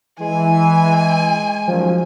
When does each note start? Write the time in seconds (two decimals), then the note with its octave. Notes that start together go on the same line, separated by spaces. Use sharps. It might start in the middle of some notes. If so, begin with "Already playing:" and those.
0.21 E3 G#3 G#5
1.67 F#2 D#3 F3 G3